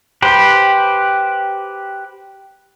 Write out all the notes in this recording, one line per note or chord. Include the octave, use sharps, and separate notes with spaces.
G4 B4 C5